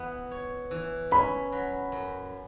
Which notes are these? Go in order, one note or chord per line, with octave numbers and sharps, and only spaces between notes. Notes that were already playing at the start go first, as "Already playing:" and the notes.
Already playing: E3 B3
C#5
E3
C#4 B5
F#3
F#2